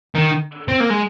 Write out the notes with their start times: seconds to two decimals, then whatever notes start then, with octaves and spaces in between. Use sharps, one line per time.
0.15 D#3
0.68 C4
0.80 A#3
0.90 G#3